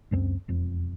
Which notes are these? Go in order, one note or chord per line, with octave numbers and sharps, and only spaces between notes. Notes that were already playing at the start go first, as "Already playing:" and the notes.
C#2 F#2 F3 C4
E1 F2